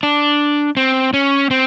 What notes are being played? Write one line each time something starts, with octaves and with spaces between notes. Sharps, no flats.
D4
C4
C#4
C4